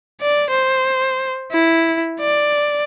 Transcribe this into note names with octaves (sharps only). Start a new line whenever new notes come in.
D5
C5
E4
D5